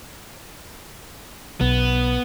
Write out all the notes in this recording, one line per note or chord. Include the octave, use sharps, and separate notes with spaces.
B1 B3